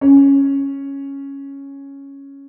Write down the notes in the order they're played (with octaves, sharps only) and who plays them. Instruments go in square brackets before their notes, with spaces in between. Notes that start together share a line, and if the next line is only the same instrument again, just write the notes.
[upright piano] C#4